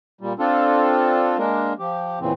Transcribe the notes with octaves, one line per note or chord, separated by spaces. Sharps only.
A#2 G3
C4 D4 F4 A4
G#3 A#3 D4 A#4
F3 G4
E2 A#2 C#3 E3 C4